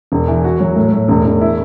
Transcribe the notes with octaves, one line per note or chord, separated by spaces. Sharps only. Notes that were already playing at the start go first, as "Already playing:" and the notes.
E1
E3
F#4
F#3
A2
A2
E1
E1
E4